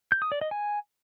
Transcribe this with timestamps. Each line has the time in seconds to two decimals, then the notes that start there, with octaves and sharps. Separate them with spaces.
0.12 G6
0.22 D#6
0.32 D5
0.41 D#5
0.51 G#5